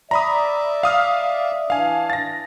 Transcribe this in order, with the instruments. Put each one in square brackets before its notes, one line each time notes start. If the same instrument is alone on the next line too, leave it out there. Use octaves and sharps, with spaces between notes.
[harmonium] D5 E5 [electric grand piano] A#5 B5 D#6
[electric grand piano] F5 D#6 F6
[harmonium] E3 D4 [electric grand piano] F5 G#5
[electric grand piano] A6 A#6